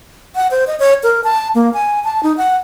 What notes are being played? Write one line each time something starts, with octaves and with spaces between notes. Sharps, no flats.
F#5
C5
D#5
C#5
A#4
A5
A#3
G#5
A5
D#4
F#5